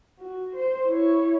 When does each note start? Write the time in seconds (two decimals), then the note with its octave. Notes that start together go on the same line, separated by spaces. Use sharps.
0.19 F#4
0.55 C5
0.88 E4 C#5